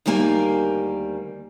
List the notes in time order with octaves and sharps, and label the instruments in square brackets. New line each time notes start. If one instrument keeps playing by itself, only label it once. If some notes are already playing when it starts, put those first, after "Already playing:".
[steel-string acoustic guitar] D2 D#3 G3 A#3 G#5